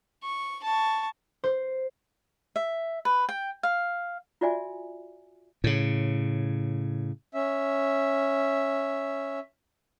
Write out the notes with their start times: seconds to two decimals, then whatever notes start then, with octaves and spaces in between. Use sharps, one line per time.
0.24 C#6
0.64 A5 C#6
1.44 C5
2.56 E5
3.05 B4
3.29 G5
3.63 F5
4.41 F4 F#4 D5 E5 G#5
5.64 A2 C#3
7.33 C#4 E5